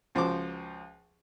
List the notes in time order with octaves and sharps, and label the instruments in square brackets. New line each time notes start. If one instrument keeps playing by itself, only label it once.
[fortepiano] C#2 F3 F#4 C5 D6